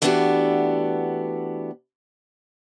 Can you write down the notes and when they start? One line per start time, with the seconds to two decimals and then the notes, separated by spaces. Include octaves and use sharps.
0.02 E3 A3 B3 D4 F#4 G4